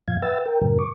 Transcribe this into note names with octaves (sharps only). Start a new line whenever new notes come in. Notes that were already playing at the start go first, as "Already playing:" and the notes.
F#2 A#2 F3 F5 G#6
B4 E5 F#5 G5 E6 A6
A#4 G5
F#2 A2 C#3 F#3 A#4
C#6 D6